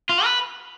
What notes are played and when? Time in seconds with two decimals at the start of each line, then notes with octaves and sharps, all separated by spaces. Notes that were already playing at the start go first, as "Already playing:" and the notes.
0.09 F4
0.24 B4